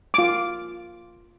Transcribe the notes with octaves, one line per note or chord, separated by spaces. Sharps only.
F4 D6